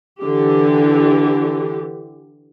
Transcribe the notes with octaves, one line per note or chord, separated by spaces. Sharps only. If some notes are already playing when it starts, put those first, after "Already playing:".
D3 E3 G4